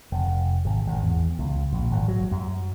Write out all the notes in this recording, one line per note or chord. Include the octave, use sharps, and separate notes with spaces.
F1
G#1
G#1
E2
C#2
A#1
G#1
F#3
F#2